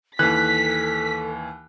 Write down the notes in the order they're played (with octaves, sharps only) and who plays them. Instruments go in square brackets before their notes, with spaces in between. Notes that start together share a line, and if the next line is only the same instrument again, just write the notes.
[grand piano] D#2 E3 [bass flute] A4 [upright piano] F#6 [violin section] B6